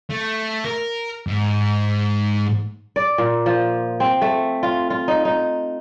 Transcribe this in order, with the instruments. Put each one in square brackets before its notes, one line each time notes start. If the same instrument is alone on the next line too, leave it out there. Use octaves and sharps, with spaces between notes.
[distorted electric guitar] A3
A#4
G#2
[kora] D5
A#2
F3
C4
A3
F4
F4
D#4
D#4